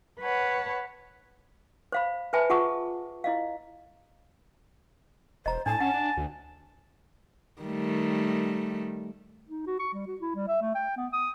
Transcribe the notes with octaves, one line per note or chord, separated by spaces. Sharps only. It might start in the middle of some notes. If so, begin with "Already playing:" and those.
B4 C#5 F#5 A5
C5 F5 B5
B4 C5 E5 G#5 A5 B5
F4 G#4 F#5 A5 C#6 D#6
E4 D#5 F5
E1 C5 D#5 A#5
A2 D4 G#5 A5
C#4 F#5 A5
D4
D2
D#3 G3 A3
D#4
F#4
C#6
G3
F#4
E4
G3
E5
A3
G5
B3
D#6